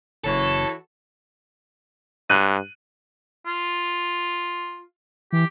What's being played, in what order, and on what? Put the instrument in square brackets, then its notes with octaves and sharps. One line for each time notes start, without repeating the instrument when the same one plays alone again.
[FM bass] F#1 [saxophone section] E3 F#4 C#5 [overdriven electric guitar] A4
[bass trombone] G2 [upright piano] F#6 D#7
[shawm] F4
[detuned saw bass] E3 [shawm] G4